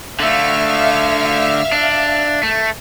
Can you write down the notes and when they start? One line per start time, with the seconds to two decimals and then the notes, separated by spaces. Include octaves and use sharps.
0.20 D3 A3 E5 F5 F6
1.72 D4
2.43 A3